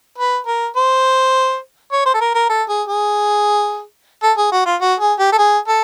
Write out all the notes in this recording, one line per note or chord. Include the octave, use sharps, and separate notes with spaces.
B4
A#4
C5
C#5
C5
A4
A#4
A#4
A4
G#4
G#4
A4
G#4
F#4
F4
F#4
G#4
G4
A4
G#4
A4